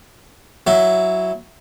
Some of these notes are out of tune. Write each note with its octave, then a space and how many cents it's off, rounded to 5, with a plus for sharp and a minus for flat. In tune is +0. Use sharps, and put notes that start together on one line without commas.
F#3 +0 E4 +0